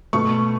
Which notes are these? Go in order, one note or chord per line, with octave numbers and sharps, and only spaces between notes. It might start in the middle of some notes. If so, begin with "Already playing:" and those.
B2 A3 C#6